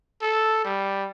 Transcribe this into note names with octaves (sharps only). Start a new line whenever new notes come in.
A4
G3